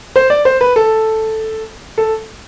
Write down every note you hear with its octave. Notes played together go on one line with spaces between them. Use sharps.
C5
D5
C5
B4
A4
A4